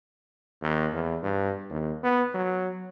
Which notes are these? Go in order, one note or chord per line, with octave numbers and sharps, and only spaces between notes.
D#2
E2
G2
D#2
B3
F#3